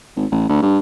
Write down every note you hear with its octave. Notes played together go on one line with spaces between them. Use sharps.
G#1
A1
D2
G2